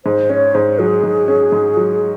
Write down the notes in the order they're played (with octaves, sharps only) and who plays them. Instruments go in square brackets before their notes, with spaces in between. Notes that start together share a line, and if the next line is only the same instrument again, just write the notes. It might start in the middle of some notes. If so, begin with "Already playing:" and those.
[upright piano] G#2 [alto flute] C5
[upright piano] C#4 [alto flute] C#5
[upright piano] G#2 [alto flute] C5
[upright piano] F#3 [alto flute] G#4
[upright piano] G#2
C#4
G#2
F#3